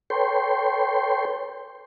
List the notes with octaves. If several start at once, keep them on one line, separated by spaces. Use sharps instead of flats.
A4 B4 C#5 G5 C6